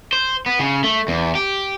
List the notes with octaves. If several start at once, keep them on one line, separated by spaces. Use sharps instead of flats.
C5
B3
C#3
A3
E2
G4